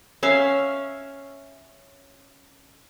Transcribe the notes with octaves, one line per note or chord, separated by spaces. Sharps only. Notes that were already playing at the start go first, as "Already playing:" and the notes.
C#4 E5 F5